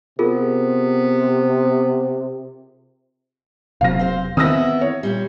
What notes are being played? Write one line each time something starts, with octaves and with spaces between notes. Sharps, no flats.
C3 B3 F4 G#4 A#4
E1 C3 F#3 F5 A#6
C4 C5
D#3 E3 B3 C4 E4 D#6 E6 A#6
C#5
A#2 G3